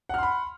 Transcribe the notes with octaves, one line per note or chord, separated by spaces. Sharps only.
F#5 B5 C6 F6